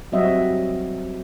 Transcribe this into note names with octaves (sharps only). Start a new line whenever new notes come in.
F#3 G3 C4 F#4 D#5 E5